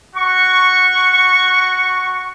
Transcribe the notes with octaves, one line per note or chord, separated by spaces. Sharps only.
F#4 C#6